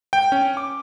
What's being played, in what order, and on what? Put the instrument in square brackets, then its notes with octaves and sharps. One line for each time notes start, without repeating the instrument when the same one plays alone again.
[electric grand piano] G5
C#4
D6